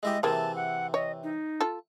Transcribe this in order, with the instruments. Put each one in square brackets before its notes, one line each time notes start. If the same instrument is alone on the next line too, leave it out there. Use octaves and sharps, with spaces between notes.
[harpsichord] G#3 E4 G4 [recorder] D#5
[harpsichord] C3 E3 [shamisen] G#3 A#3 [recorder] A5
[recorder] F#5
[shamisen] C#5 [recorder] D#5
[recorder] D#4
[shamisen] F4 A4